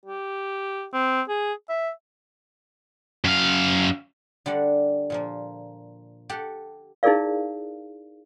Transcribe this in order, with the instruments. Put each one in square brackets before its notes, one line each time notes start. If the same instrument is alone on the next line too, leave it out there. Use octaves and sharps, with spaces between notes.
[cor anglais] G4
C4
G#4
E5
[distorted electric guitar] F#2 F5
[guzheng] D3 G3 D5 F#5
A#2 F3 A#3
G4 A4 F#5 G5
[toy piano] D#4 E4 G#4 A#4 D5 F5